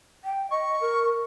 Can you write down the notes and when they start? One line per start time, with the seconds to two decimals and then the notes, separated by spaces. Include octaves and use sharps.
0.24 G5
0.51 D#5 C#6
0.81 A#4